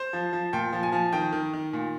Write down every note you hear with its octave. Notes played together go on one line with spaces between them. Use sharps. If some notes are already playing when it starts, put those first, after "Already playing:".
Already playing: C5
F3
F3
A#2 G5
F3
G#5
F3
D#3 G5
D#3
D#3
A#2